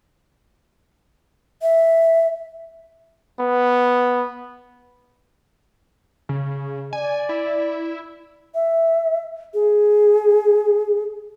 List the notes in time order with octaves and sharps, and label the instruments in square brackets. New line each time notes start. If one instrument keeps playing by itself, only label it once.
[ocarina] E5
[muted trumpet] B3
[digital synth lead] C#3
[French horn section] D5 [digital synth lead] G#5
[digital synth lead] E4
[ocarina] E5
G#4